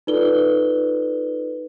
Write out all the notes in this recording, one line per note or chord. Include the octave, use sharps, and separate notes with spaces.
D#4 F4 A4 B4 D5 G7